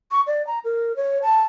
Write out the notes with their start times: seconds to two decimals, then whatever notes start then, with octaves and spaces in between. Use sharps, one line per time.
0.11 C#6
0.27 D5
0.47 A#5
0.65 A#4
0.96 C#5
1.23 A5